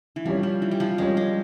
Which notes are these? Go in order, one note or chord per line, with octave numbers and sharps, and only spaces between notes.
E3
F3 G3 C#4 G4 C#5
F3
E3
G3
F3
G3 G#3 C#4 G4 C#5
G#3